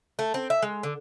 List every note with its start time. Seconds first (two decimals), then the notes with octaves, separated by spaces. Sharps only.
0.19 A3
0.34 C4
0.50 E5
0.62 G#3
0.83 D3